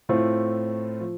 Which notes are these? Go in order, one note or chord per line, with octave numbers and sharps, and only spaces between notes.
A2 A3 C4 F4
F3